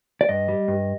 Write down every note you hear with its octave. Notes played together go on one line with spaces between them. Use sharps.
D5
G2 D#5
G3
G2